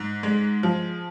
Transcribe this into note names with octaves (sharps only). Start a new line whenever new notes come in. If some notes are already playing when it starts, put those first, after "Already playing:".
Already playing: G#2
G#3
F3